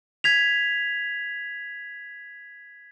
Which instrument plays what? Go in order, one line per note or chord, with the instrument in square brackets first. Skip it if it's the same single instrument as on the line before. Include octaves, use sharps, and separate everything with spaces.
[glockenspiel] G#6 B6 F7